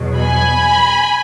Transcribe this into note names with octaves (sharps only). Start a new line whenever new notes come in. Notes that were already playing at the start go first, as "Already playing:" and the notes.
Already playing: E2 B2 F#3
G#5 B5